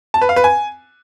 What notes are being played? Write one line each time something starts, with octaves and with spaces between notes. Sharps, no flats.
A5
B4
F5
B4
G#5